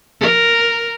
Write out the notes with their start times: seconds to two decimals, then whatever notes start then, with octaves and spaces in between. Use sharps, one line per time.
0.21 A#4